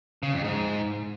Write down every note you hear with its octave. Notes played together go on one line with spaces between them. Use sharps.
C#3
F2
G#2